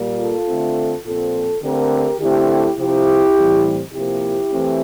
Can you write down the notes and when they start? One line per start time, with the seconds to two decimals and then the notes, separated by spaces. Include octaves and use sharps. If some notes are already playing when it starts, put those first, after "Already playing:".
Already playing: A#2 G3 A#3
0.17 F4 A4
0.47 D3 A3 C4
1.04 A#2 F3 C4 F4 A4
1.62 D3 A3 C4 G4 A#4
2.20 D3 A3 C4 E4 G4
2.77 C3 F3 C4 E4 G4
3.36 A2 E3 G3 C4
3.93 C3 F3 A#3 E4 G4
4.51 E3 A3 C4